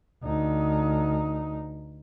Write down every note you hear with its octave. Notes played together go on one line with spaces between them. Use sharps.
D2 D#4